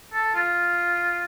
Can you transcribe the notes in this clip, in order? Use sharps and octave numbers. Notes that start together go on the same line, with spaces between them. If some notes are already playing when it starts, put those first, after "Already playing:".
A4
F4